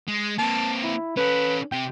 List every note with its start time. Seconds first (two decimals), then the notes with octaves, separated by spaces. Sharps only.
0.08 G#3
0.39 A#3 C4 A5
0.83 E4
1.17 C#4 A4 B4
1.72 C3 G5